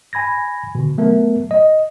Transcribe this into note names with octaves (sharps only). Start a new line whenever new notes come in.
G#5 B5 G#6 A#6
B2 D3
F#3 A3 B3 A#4
D#5